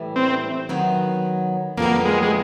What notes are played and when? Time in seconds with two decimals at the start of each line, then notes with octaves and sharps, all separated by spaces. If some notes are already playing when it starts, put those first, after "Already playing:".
Already playing: A2 E3 G3
0.16 C4
0.69 D#3 F#3 B3
1.77 F2 D3 G3 A#3 B3
2.05 G#3
2.23 G#3